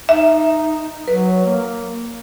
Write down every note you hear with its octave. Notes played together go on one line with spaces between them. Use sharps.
D#4 E5
F#3 B4
A#3